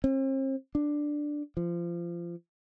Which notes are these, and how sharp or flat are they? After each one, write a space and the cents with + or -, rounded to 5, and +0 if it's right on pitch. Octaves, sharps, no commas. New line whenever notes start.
C4 +40
D4 +5
F3 -25